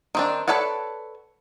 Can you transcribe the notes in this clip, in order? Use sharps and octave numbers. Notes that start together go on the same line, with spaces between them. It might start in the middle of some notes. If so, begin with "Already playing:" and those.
D#3 C4 D4
A4 B4 C#5 D5 F#5